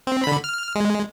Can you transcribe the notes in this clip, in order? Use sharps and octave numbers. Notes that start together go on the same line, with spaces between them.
C4
D3 B5
F6
G#3